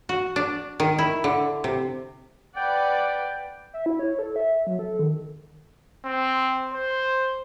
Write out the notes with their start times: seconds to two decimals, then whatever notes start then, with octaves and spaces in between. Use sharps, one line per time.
0.09 F#4
0.36 D4
0.80 D#3
0.98 E4
1.24 D3
1.64 C3
2.57 B4 D5 F#5 G5
3.74 E5
3.86 E4
3.99 C#5
4.19 A4
4.36 E5
4.67 F#3
4.79 A4
4.99 D#3
6.05 C4
6.74 C5